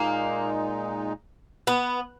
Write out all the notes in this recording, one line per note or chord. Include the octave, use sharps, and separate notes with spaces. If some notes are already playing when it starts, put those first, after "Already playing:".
Already playing: A#2 G#3 A#3 D#4
B3